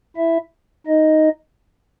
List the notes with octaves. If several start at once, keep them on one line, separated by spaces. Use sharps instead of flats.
E4 E5
D#4 D#5